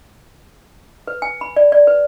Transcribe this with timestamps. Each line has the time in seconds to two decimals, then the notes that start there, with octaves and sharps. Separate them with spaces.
1.08 B4
1.22 G#5
1.41 B5
1.56 D5
1.72 D5
1.87 B4